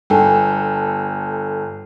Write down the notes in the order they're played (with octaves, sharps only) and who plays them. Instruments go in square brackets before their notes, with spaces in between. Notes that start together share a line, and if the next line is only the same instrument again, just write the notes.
[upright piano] G1 A4 [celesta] G5 G#5